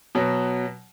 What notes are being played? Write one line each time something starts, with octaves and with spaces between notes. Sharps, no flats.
B2 F#3